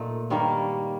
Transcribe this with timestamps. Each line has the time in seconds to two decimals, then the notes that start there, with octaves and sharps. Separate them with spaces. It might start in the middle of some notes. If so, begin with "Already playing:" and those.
Already playing: A#2 A3 D#4
0.30 G2 D#3 G3 A#3